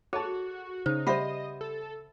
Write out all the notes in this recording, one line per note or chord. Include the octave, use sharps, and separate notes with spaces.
F#4 G#4 A4 C#5 A5
C#3 D#4 C5
G3 C5 D#5 E5 F#5 B5
A4